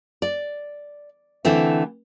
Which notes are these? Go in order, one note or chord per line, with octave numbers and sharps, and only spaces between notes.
D5
D3 E3 A3 C4